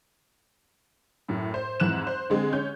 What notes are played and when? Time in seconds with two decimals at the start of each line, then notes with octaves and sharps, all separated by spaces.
1.28 F#2 A2
1.54 C5
1.80 F2 G#2 E3 F#6 E7
2.07 C5
2.30 D3 G#3 C4
2.53 C#4 G6